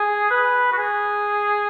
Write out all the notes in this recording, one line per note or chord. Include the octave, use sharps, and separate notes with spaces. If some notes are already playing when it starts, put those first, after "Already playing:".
Already playing: G#4
B4
F#4
G#4